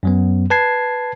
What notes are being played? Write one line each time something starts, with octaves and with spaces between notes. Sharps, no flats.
F#2 F#3 B3
B4 A5 G#6 C7